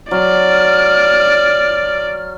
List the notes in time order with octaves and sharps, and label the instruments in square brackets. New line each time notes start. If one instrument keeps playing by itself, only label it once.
[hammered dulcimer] F#3 G#5 [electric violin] D5 [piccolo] F6